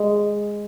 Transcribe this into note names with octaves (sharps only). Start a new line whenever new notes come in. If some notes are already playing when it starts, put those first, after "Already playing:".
Already playing: G#3